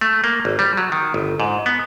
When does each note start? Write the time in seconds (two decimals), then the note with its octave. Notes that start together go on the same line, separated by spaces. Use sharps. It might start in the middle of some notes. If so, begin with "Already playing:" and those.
0.01 A3
0.24 A#3
0.45 G#1
0.59 G3
0.77 F#3
0.92 D#3
1.14 G1
1.40 G#2
1.66 B3